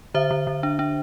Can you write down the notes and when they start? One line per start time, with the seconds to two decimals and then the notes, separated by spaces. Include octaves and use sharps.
0.14 D3 C5 E5
0.31 D3
0.47 D3
0.63 D4
0.79 D4